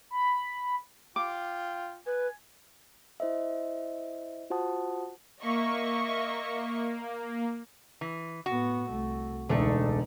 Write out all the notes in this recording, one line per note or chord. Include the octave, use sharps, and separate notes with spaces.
B5
F4 G5 D6
B4 G#5
E4 C5 D#5 E5
F4 F#4 C5 F#5 A5 D#6
A#3 D#5 E5 C#6
E3
A2 B3 F#4
C2 A3
E1 C#2 D3 A3 D#4